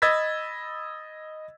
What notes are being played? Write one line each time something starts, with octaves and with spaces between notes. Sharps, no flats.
D#5 B5 E6 G#6 A6 B6